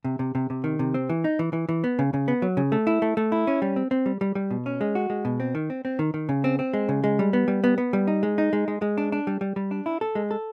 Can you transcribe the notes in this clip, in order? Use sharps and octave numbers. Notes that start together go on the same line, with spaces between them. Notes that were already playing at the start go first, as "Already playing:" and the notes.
C3
C3
C3
C3
D#3
C3
C4
E3
D#4
E3
E3
E3
B3
C#3
C#3
B3
F#3
C#3
A3
E4
A3
A3
E4
C#4
G3
C4
C4
G3
G3
G3
B2
C#4
G#3
F#4
G#3
B2
C4
D#3
C4
C4
D#3
D#3
C#3
C4
C4
G#3
C#3
G#3
G3
B3
G3
B3
B3
G3
D#4
G#3
D#4
G#3
G#3
G#3
D4
D4
G3
G3
G3
D4
E4
A4
G#3
A4